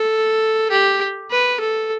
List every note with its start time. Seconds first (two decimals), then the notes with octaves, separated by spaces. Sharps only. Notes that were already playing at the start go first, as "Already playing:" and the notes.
Already playing: A4
0.71 G4
1.31 B4
1.60 A4